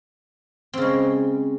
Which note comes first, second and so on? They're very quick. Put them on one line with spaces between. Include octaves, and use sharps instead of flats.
C4 C#3 G#3